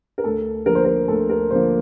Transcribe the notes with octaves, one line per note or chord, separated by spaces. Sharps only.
A#4
D2 A4
D3 F3 A#3 A#4
C5
A#4
D2 A4
A#4
D3 F3 A#3 C5